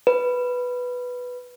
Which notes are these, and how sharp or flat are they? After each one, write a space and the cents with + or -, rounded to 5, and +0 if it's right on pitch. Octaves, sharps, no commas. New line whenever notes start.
B4 +0